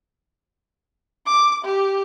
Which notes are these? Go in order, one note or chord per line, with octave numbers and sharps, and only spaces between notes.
D6
G4